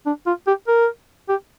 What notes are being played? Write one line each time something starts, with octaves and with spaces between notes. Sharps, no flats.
D4
F4
G4
A#4
G4